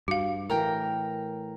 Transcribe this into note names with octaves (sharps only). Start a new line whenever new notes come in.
G2 F#4 F5
A2 E3 A#4 G5